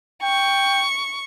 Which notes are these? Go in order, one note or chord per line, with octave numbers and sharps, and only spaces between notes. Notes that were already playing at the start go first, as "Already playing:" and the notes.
G5 C#6